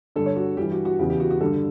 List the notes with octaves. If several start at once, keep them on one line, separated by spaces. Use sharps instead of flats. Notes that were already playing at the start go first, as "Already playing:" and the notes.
G2 D3 A4
C#5
F#4
G2 E3 G4
F#4
F#4
E2 C#3 E3 G4
G4
F#4
F#4
G2 D3 A4